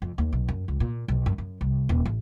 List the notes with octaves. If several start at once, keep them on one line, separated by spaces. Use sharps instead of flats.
F2
D#2
B1
F#2
C#2
A#2
B1
F#2
F#2
C2
D#1
A1